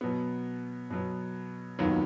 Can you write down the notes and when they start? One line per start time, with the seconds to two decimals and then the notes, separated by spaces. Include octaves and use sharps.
0.01 B2 F#3 B3
0.91 B2 F#3 B3
1.79 F1 D#2 D#3 F#3 B3